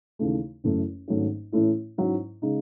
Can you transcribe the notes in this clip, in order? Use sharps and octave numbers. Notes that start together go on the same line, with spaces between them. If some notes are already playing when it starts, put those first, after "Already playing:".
D#2 C#3 E3 A3
F#1 F#2 E3 A3
G#1 G#2 F#3 A3 C#4
A2 E3 A3 C#4 E4
G#2 F#3 C#4 E4
C#3 G#3 D#4